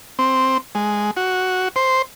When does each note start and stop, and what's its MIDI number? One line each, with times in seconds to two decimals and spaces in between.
0.19 0.58 60
0.75 1.11 56
1.17 1.68 66
1.76 2.02 72